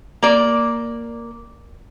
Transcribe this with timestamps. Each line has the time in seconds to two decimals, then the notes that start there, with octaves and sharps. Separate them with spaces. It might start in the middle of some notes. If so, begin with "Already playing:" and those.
0.22 A#3 D5